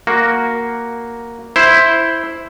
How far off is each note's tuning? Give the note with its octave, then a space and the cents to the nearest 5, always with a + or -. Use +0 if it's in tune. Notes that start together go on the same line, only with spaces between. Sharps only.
A#3 +0 F#4 +0
E4 +0 C5 +0